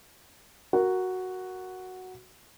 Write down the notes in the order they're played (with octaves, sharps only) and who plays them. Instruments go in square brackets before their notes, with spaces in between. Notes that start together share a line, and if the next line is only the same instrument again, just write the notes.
[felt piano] F#4 A#4